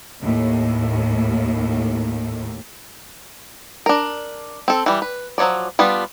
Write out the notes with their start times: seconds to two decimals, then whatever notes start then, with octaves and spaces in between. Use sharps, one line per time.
0.20 D#2 A2
3.86 D4 A#4
4.68 C4 A4
4.86 E3 G3
5.02 B4
5.38 F3 F#3 B3 C#5 D5
5.79 G3 B3 D4 F4